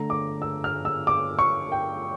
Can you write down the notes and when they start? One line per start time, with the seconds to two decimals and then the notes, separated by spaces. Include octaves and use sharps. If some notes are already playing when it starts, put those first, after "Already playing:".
Already playing: D3 A3 A#5
0.10 D6
0.42 E6
0.64 F6
0.85 E6
1.07 D6
1.39 C#6
1.72 G5